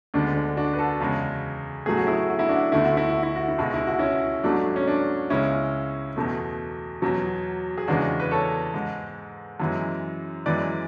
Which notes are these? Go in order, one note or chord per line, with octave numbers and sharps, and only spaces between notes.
D2 D3 G#3 D4
D4
D4 F#4
B4
F#4 A4
E2 C#3 G#3
A2 F#3 A3 G#4
F#4
E4 G#4
F#4
E4
D4 F#4
D2 D3 A3 E4
F#4
E4
F#4
E4
F#4
E4
C#2 B2 G#3 F#4
E4
F#4
C#4 E4
G#2 F#3 A3 D4
C#4
D4
C#2 C#3 G#3 C#4 E4
E2 B2 A3
E2 B2 F#3
G#4
E2 C#3 E3 G#3 D4 F#4
B4
A4 C#5
G#2 G#3
F#2 E3 G#3
F#2 E3 G#3 B4 D5